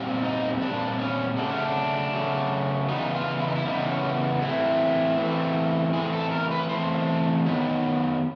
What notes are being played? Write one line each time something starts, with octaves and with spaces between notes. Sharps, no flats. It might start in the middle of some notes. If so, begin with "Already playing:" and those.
Already playing: A#2 G3 C4
D#4
A#2 G3 C4 D4
C#4
C#3 F#3 A3 D4
C#4
D4
C#3 F#3 A3
C#3 E3 G3 B3 D#4
F4
E4
D#4
E4
C#3 E3 G3 B3 D#4
C#4
E3 A3 C4 E4
E3 A3 C4
E3 A3 C4 G#4
A4
A#4
B4
E3 A3 C4 C5
D#3 F#3 B3